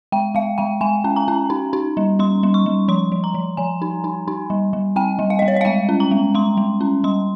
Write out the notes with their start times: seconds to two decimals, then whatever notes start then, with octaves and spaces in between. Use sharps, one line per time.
0.12 G#3 G5
0.35 G#3 F5
0.58 G#3 G5
0.81 G#3 G#5
1.04 C#4
1.16 A#5
1.28 C#4
1.50 D#4
1.73 D#4
1.97 G3
2.19 G3 C6
2.43 G3
2.54 C#6
2.66 G3
2.88 F3 C6
3.12 F3
3.24 A#5
3.34 F3
3.57 F3 G#5
3.82 D#4
4.04 D#4
4.28 D#4
4.50 G3
4.73 G3
4.96 C4 G5
5.19 G3
5.30 F5
5.39 G3 D#5
5.48 C#5
5.56 D#5
5.61 F5
5.65 G#3 G5
5.89 C#4
6.00 A#5
6.11 G#3
6.34 G#3 C6
6.57 G#3
6.81 C#4
7.04 G3 C6